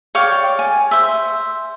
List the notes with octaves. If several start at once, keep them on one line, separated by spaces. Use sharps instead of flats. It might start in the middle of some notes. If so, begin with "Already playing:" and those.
C#5 D5 F5 G5
G#5
C5 E5